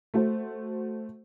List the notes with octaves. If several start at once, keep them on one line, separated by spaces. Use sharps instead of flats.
A3 F#4 C5